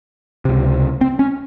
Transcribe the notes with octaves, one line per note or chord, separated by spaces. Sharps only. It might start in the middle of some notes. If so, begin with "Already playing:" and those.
C#2 C3
C4
C#4